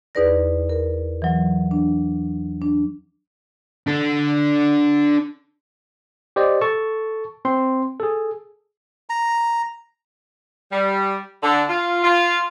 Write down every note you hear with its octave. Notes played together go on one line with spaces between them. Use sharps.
E2 D#4 G#4 B4 D5 A#6
A#4
E3 F#3
D4
D4
D4 A4
G4 C5 D5 D#5
A4 A5 C#6
C4 C6
G#4 A4
A#5
G3
D3
F4
F4